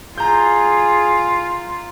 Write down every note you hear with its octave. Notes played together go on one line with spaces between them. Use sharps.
F4 G#4 A#5 G6